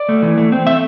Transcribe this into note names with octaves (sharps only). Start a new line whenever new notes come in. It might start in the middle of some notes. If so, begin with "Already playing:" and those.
Already playing: D5
A3
E3
A3
C4
A3 E5